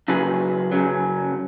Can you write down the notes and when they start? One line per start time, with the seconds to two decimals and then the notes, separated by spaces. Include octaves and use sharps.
0.08 F#2 C#3 F#3 G#4 B4
0.71 F#2 C#3 F#3